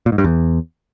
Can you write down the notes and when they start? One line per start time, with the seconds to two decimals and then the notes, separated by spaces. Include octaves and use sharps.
0.06 A#2
0.12 G#2
0.18 G2
0.24 E2